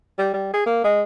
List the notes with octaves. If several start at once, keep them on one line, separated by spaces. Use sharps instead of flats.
G3
G3
G#4
A#3
G#3